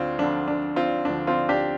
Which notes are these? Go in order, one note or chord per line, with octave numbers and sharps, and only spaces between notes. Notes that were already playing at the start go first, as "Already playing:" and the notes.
Already playing: D2 D3 C4 D4 F4
D2 D3 F3 D4
D4
C4 F4
D2 D3 F3 D4
C4 F4
D4 G4